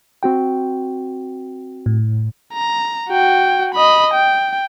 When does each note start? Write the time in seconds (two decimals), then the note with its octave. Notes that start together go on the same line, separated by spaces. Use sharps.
0.23 C4 F#4 G5
1.86 A2
2.53 A#5
3.08 F#4 G5
3.75 D#5 B5
4.14 G5